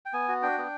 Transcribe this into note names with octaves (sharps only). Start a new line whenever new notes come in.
G5
B3 G#5
F#4
D4 G5
B3